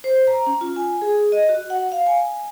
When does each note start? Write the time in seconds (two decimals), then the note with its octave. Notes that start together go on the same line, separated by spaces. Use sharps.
0.04 C5
0.27 A#5
0.47 C#4
0.61 F4
0.76 G#5
1.02 G#4
1.32 D#5
1.49 F#4
1.70 F#5
1.92 F5
2.07 G#5